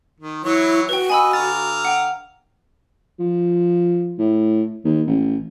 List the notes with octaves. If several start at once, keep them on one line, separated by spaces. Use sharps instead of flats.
D#3
E3 F#3 E4 C#5
F#4 B4 G5
D#5 G#5 B5 E6
D3 F5 A#5 A6
F#5 G5
F3
A2
D#2
A1